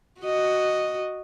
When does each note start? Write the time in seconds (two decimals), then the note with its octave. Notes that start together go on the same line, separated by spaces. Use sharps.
0.21 F#4 D#5